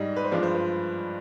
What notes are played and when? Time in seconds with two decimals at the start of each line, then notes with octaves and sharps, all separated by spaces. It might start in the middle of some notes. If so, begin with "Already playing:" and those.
Already playing: G#2 G3 D#5
0.16 B4
0.24 C5
0.31 G2 F3 G#3 D5
0.43 C5
0.54 B4